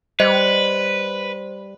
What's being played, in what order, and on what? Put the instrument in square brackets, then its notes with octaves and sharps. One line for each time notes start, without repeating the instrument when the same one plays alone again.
[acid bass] G3 [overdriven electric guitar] B4 [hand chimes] C5 [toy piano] D#5